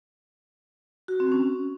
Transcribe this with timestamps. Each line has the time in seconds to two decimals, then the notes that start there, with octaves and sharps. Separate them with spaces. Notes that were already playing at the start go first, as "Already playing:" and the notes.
1.08 F#4
1.20 C4
1.32 C#4